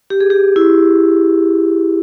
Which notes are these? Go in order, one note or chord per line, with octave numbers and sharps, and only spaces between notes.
G4
G#4
G4
E4